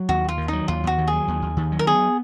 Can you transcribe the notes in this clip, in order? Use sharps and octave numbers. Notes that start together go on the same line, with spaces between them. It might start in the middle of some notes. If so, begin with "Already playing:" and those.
Already playing: F#3
D#2 F#4
D#2 F4
D#3
F#3 D#4
D#2 F4
D#2 F#4
D#3
G#4
F#3
D#2
D#2
D#3
F#3
A#4
B3 G#4